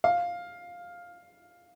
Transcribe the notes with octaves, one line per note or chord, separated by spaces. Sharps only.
F5